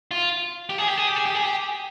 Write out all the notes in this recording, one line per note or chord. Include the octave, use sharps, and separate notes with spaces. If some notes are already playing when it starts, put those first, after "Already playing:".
F4
G4
G#4
G4
G#4
G4
G#4
G4
G#4
G4